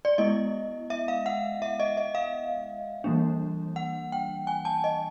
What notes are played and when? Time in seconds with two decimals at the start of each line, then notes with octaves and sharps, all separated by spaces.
0.05 D5
0.18 G#3 B3 E4 D#5
0.90 E5
1.08 F5
1.26 F#5
1.62 E5
1.80 D#5
1.97 D#5
2.15 F5
3.04 E3 G3 A#3 D4
3.76 F#5
4.12 G5
4.47 G#5
4.65 A5
4.84 D#5